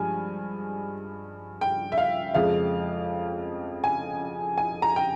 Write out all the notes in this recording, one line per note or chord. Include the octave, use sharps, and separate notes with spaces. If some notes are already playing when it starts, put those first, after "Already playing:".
Already playing: G2 F3 G#3 G#5
G5
E5
F5
F2 C#3 F3 G#3 F5
G#5
G#5
A#5
G5